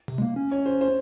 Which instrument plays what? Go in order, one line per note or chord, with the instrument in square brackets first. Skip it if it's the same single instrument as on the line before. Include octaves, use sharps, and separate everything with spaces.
[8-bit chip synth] C3
G#3
A#3
C#4
[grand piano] C#5
C5
C5